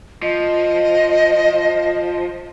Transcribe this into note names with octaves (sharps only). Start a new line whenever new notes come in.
F3 D#5